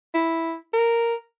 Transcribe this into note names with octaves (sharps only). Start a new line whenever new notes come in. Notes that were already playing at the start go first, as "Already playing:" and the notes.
E4
A#4